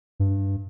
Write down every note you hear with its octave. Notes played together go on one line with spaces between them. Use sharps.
G2